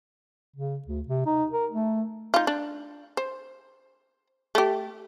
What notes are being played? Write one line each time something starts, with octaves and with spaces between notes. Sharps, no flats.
C#3
D2
C3
D#4
A#4
A3
D#4 F4
D4
C5
A3 G4